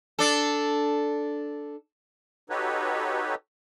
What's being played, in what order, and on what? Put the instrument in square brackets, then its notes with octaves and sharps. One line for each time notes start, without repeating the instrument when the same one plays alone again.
[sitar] D4 A4
[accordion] D#4 F#4 G4 A4 B4 C#5